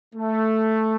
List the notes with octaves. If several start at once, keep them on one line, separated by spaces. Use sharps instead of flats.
A3